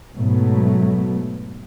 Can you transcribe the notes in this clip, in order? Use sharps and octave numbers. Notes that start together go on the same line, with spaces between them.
G#2 B2 F#3 A3 B3